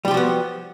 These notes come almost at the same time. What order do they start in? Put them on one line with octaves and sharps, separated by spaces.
G3 G4 F3 F#4 B3